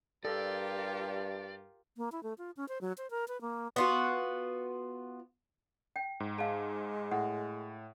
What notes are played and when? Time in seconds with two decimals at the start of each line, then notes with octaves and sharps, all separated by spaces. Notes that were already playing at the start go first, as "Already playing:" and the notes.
0.25 G2 F4 G4 A4 A#4 D5
1.97 A#3
2.12 E4
2.23 A3
2.38 F4
2.57 C#4
2.69 C5
2.81 F#3
2.98 C5
3.11 A#4
3.28 B4
3.41 A#3
3.76 B3 F4 F#4
5.96 G5
6.20 G#2
6.38 G#3 F5 A5
7.11 A2 F#5